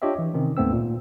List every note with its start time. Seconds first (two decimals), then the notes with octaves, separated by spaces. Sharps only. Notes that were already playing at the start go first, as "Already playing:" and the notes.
0.02 D4 F4 G4 C#5 D#5 E5
0.19 E3
0.34 C3 D#3 C4 C#4 D#4
0.57 D2 G#2 A3 B3 C4 E6
0.72 A#2